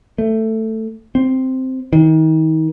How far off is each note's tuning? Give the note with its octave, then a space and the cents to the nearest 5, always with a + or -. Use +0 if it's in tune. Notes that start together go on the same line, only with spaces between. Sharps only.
A3 +10
C4 -5
D#3 +35